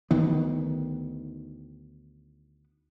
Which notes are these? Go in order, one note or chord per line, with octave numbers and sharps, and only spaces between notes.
D2 D#3 B3